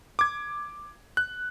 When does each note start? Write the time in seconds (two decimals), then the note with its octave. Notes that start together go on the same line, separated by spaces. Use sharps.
0.19 D6 G#6
1.17 F#6